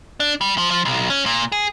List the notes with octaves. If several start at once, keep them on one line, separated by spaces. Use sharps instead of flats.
D4
G3
F3
F3
B1
C#4
A#2
G#4